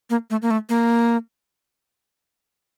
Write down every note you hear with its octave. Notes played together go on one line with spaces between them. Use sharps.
A#3
A3
A#3
A3
A#3